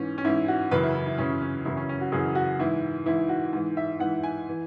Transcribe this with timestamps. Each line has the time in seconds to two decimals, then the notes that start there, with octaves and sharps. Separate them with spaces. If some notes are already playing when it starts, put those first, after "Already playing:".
Already playing: G#2 E3 C#4
0.18 C#4
0.24 G#2 E3 E4
0.48 F#4
0.71 F#2 C#3 E3 B4
0.83 E4
0.95 E4
1.07 E4
1.18 F#2 C#3 E3 C#4
1.42 C#4
1.65 F#2 C#3 E3 E4
1.77 C#4
1.89 C#4
2.01 F#4
2.12 F#2 C#3 E3 G#4
2.35 F#4
2.59 G#2 E3 E4
3.06 G#2 E3 E4
3.29 F#4
3.53 G#2 E3
3.77 E5
3.99 G#2 E3 F#5
4.23 G#5
4.49 E3